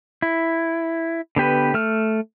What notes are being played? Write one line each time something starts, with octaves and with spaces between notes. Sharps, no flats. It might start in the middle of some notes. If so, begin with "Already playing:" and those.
E4
D3 B3 G4 B4
A3 F6